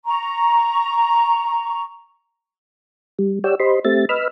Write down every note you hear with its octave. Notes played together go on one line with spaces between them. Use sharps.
A#5 C#6
G3
G4 C#5 D5 F#5 G5 E6
G4 C5 D#5 B5 C6
A3 C4 G4 E5 A6
B4 D#5 B5 E6 F6